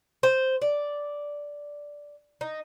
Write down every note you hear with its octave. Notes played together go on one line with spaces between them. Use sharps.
C5
D5
D#4